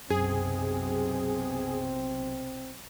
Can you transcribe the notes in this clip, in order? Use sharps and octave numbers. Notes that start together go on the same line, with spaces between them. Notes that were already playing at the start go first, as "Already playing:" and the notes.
B1 F#2 C3 C4 G#4